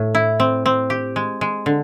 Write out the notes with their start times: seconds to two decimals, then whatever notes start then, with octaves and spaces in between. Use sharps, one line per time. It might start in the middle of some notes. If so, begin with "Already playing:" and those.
Already playing: A2
0.15 E4
0.40 C4
0.66 C4
0.90 G4
1.16 G#3
1.41 G#3
1.66 D3